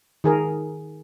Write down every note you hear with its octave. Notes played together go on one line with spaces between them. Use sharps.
D#3 G#4 A#4